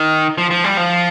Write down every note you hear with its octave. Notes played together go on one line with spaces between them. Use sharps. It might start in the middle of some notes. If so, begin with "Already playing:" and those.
Already playing: D#3
F3
F3
G3
F3